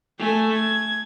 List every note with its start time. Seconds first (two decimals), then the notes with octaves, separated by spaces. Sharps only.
0.19 A3 G#5
0.53 G#6